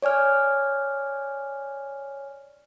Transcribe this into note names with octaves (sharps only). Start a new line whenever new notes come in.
C#5 D5 G#5 F6